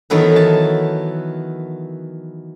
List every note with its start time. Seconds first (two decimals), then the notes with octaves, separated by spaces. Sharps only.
0.10 D#3 E3 F#3 B3 A4 B4
0.36 A5